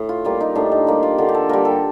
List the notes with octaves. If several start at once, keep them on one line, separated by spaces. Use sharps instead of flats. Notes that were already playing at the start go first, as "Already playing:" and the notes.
Already playing: A2
F4
G3 A#3 F4
D#4
A2 D4
D#4
G3 A#3
F4
D3 F4
G4
A4
G3 A#3 A#4
A4